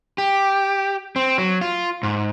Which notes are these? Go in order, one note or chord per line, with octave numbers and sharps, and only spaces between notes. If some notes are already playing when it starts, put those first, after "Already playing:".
G4
C4
F#3
F4
G#2